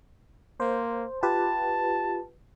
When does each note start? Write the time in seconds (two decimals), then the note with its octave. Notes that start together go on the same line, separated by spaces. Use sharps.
0.60 A#3 C5
1.23 F4 G4 B4 A5